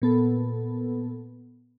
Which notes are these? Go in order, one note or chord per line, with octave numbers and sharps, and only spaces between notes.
A#2 B3 A4